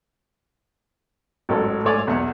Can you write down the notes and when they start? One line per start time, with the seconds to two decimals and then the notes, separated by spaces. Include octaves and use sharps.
1.49 A1 G#2 F#3 A4 C#5
1.84 G#2 A3 C#5 D5 G#5
2.07 B1 E2 E5 F#5